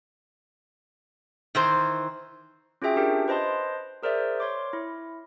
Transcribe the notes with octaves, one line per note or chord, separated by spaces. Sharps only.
D#3 E3 C5
C#4 F4 F#4 G#4 E5 G5
C#4 D4 F4 G4 A#4 G5
B4 C5 D#5 A5 C6
G#4 A#4 C5 D5 E5
C#5 C6 D6
E4